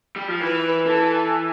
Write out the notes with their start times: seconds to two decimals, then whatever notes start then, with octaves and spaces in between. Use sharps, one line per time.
0.16 G3
0.28 F3
0.40 E3 B4
0.86 E3 A4